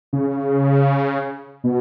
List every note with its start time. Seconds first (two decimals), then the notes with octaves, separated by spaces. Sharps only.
0.13 C#3
1.64 B2